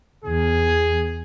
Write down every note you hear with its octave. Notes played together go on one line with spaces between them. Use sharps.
E2 G#4